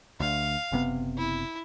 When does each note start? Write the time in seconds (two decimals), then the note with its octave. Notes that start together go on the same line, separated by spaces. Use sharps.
0.20 D2 F5
0.72 F#1 C3 B3
1.18 E4